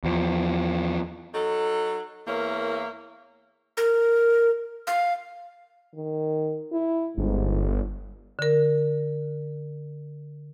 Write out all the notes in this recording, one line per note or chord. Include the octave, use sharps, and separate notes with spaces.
E2 F3
F#3 D#4 A4
E2 A#3 A#4 C#5 E5
A#4
F5
D#3
E4
G1 G#2
D3 A#4